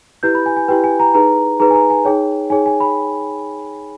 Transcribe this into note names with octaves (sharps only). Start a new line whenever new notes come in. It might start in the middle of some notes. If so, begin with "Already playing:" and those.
E4 G4 B4 G6
B5
G#5
G#5
E4 G4 B4 G5
G#5
A#5
D#4 G#4 B4 A#5
D#4 G#4 B4 A#5
G#5
A#5
G#5
D#4 G#4 C#5 G5
D#4 G#4 C#5 G#5
G#5
B5